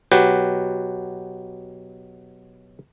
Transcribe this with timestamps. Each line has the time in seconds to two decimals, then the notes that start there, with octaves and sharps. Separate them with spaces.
0.12 B2 F#3 G4 B4